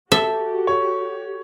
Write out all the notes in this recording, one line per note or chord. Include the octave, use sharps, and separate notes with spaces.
F#4 G4 A4 E5
C#5